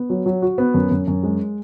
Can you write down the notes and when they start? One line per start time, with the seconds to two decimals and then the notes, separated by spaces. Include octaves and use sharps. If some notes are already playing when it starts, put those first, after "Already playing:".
Already playing: B3
0.10 F#3
0.26 F#3
0.42 F#4
0.58 B3
0.74 F#2
0.91 F#2
1.08 F#2
1.23 G#3